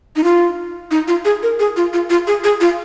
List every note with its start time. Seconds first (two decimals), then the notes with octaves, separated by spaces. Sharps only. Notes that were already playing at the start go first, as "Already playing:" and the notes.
0.16 D#4
0.24 F4
0.91 D#4
1.07 F4
1.25 G#4
1.43 A#4
1.59 G#4
1.76 F4
1.93 F4
2.10 F4
2.27 G#4
2.44 G#4
2.61 F4